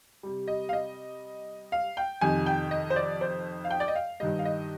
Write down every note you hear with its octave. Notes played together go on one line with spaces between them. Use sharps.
C3 G3
D#5
F5
D#5
F5
G5
F2 C3 D#3 G#5
G5
D#5
C5
D5
C5
F5
G5
D5
D#5
F5
G2 D#3 G3 D#5
F5
D#5